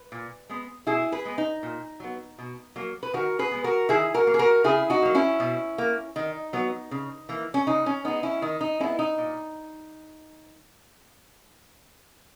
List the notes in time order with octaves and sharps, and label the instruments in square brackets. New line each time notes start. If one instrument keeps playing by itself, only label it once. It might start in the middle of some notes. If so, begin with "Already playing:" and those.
Already playing: [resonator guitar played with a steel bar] B4
A#2
G#3 B3
B2 E4 G#4
G#4 B4
G#3 B3
D#4
A#2
F#3 B3
B2
F#3 A#3
B4
D#3 F#4 A#4
G#4 B4
G#3 B3
F#4 A#4
D#3 E4 G#4
F#4 A#4
A#3
G#4
F#4 A#4
C#3 E4 G#4
D#4 F#4
F#3 A#3
C#4 E4
B2
A#3
D#3 D#4
F#3 B3
C#3
E3 A#3
C#4
C#3 D#4
C#4
G#3 B3 D#4
C#4 E4
D#3 D#4
D#4
G#3 B3 C#4 E4
D#4
A#2